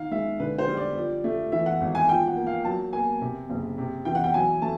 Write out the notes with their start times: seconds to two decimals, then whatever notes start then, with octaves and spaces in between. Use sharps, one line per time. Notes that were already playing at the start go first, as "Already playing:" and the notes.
Already playing: D#3 F5
0.11 G#3 E5
0.40 D3 B4
0.58 C5
0.68 G3
0.77 D5
0.96 F3
1.24 A3
1.52 E3 E5
1.66 F#5
1.81 G#1
1.95 G#5
2.09 F3 G5
2.28 F#5
2.37 A#3
2.47 F5
2.65 F#3 A5
2.93 A#3 G#5
3.21 C3
3.50 F#1
3.78 C3
4.05 E3 G5
4.15 F#5
4.24 G5
4.34 F#3 G#5
4.62 A3 A5